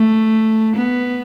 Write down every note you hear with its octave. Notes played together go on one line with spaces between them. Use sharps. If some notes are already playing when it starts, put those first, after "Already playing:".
Already playing: A3
B3